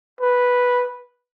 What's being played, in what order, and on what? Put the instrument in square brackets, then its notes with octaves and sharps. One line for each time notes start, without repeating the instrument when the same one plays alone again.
[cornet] B4